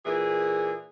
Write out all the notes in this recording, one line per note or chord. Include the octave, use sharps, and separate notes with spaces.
A#2 E3 G#4